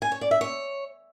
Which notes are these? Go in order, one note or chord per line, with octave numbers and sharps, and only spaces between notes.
G#5
C#5
D5
E5
C#5